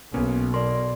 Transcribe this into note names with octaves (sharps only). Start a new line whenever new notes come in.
B1 A#3 B3 C#4
A#4 D5 C6